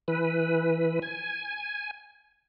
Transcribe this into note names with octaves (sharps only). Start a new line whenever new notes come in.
E3 B4
G#5